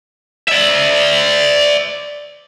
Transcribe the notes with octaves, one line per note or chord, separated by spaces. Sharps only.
D5 E5